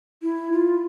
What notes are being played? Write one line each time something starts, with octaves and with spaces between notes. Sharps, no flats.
E4
F4